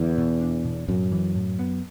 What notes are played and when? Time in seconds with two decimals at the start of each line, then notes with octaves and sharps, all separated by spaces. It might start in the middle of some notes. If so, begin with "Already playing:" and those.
Already playing: E2 D3
0.18 B2
0.41 D4
0.65 B2
0.89 F#2 A2
1.12 E3
1.36 A2
1.59 B3